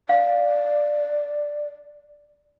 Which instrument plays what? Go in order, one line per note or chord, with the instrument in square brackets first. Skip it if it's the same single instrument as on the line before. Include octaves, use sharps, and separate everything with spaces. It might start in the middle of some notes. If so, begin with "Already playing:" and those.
[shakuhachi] D5 [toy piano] F5